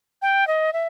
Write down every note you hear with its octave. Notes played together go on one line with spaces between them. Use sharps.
G5
D#5
E5